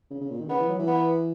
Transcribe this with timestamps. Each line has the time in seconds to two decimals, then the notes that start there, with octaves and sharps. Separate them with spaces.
0.10 C#3
0.21 C#3
0.31 A#2
0.40 D#3
0.49 C#3 B3
0.60 E3
0.69 F#3
0.79 E3
0.88 B3